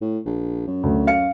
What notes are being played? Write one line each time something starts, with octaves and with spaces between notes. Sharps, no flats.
A2
A#1
F#2
D2
F5 C#7